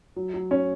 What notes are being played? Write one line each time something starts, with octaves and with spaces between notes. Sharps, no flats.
F#3
F#3
C#4